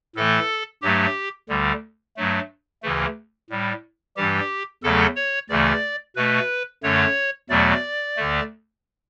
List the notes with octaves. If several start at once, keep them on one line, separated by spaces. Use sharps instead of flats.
A2 E3 A3 A4
G2 F#3 A3 G4
D2 D3 G3
G2 F#3 A3
D2 C#3 E3 A3
A2 G3
G2 E3 G3 G4
E2 C#3 F#3 A3 A4
C#5
D2 C#3 E3 A3 D5
B2 A3 B4
F#2 D3 A3 C#5
E2 B2 F#3 A3 D5
D2 D3 A3